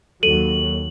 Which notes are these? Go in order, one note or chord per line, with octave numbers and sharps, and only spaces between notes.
D#2 F#3 A4 D#7 F#7